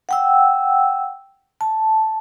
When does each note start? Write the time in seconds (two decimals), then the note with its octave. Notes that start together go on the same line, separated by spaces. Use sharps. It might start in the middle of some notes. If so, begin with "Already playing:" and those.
0.09 F#5 G5 E6
1.61 A5